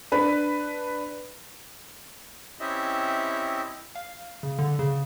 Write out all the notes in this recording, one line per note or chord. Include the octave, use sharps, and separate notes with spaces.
D4 B4 B5
C4 C#4 E4 G4 D#5 E5
F5
C#3
D3
C#3